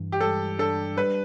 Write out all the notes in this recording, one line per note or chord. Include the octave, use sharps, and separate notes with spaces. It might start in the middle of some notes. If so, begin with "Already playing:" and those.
Already playing: G2 E3
G4
G3 A4
D4 A4
G3 B4